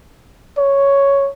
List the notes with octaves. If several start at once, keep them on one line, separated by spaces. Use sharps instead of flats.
C#5